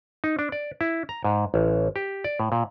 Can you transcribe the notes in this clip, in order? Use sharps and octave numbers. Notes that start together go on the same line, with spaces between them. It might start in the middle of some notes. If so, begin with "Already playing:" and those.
D#4
D4
D5
E4
A#5
G#2
A1
G4
D5
A2
A#2